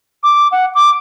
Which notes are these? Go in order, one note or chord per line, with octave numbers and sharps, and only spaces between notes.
D6
F#5
D6